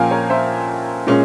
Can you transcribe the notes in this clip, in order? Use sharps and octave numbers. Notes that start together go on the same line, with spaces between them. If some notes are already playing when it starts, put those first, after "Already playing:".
Already playing: A#2 F3 A#3 C#4 F5 G5 G#5 A#5
A#4 C#5
C5 E5
A#2 G#3 C#4